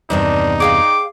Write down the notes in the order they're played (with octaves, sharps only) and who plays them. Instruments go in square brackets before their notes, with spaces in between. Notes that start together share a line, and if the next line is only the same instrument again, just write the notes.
[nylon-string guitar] E2 G2 C3 [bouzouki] D#3 C4 D4 [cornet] D#4
[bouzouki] G#4 F5 G5 [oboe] D6